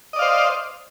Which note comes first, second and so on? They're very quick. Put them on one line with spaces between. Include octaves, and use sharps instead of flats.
D#5 D5 F5 C5